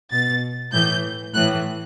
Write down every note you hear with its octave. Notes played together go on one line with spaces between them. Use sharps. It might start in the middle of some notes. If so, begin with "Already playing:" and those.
B2 A6
A2 E3 G6
A2 E3 F#6